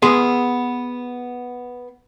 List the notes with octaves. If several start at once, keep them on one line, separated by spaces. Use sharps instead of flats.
B3 G#4 C6